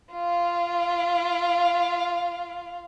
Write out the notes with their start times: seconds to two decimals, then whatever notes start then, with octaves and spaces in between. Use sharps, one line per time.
0.12 F4 F5